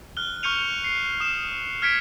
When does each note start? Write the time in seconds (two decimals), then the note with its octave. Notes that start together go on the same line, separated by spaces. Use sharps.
0.17 F6 F#6 G7
0.43 C#6 F6 G6 C#7 D#7 F7
0.84 C7
1.20 D#6 E7
1.82 F6 G#6 B6 C#7 D7